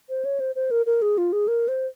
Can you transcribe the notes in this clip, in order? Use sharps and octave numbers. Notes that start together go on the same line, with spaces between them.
C5
C#5
C5
C5
A#4
A#4
G#4
F4
G#4
A#4
C5